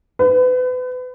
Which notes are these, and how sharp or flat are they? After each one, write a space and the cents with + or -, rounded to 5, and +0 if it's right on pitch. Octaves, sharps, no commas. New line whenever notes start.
B4 +35